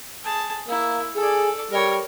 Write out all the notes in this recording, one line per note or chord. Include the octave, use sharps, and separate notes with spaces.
G#4 A5
A#3 E4
G#4 A4 D5
G3 A#4 C#5